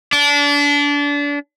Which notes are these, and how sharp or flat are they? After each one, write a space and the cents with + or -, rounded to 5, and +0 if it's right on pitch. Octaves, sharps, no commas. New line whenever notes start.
D4 -30